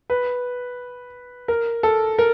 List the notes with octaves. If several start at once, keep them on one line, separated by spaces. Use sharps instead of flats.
B4
A#4
A4
A#4